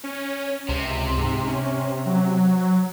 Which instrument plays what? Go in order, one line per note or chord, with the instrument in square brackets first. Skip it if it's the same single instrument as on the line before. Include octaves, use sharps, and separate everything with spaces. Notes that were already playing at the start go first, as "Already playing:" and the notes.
[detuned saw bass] C#4
[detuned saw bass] C#2 [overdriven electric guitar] C3
[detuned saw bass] G#2
C#4
F#3